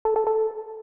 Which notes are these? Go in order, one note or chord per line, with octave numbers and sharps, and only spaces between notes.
A4
A4
A4